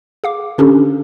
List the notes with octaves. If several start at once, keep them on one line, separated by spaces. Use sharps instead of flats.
G#4 F5 D6
D3 C#4 D4 G4 A4